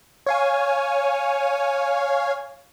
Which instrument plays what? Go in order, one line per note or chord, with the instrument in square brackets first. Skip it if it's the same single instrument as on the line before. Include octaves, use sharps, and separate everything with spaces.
[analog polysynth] C#5 F5 G#5